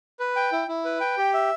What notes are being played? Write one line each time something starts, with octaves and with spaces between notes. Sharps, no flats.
B4
G5
E4
E4
B4
G5
G4
E5